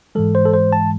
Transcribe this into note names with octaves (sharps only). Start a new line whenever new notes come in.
G#2 E3 G#3 A4
C5
A4
C5
A5